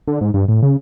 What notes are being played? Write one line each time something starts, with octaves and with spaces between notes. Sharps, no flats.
D3
G#2
G2
A2
C#3